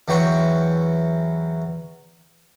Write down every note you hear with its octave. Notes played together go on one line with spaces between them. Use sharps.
E2 E3 F#3 G5 C#6